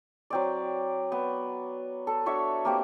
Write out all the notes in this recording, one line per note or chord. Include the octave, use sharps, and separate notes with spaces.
F#3 C4 D5
B3
A4
D4 F#4 C#5 E5
A#3 C4 G4